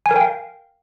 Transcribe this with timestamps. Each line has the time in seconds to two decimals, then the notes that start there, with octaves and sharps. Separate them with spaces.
0.06 G#5
0.11 A#4
0.16 G5
0.21 F5